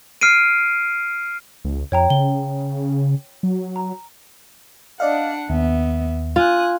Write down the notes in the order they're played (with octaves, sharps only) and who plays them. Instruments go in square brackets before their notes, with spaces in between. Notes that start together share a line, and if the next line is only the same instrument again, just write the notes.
[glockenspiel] F6 C7 D7 D#7
[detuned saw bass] C#2
[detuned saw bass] F2 [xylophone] C#5 G5 A#5
[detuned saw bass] C#3 [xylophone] G7
[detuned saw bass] F#3
[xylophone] A#5
[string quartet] D4 F#5 [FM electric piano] D5 D#5 F5
[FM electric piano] D#2 [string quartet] B3 E5
[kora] F4 [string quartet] G#5 D#6 F#6